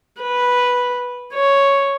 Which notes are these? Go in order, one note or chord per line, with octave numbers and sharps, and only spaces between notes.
B4
C#5